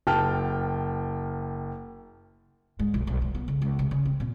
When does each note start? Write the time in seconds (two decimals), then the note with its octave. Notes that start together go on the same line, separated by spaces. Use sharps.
0.07 F#1 G5 A5 F6
2.79 G#2
2.94 B1
3.07 B1
3.22 B2
3.35 B3
3.48 C#3
3.62 C#2
3.79 C3
3.91 C#3
4.05 C4
4.20 A#2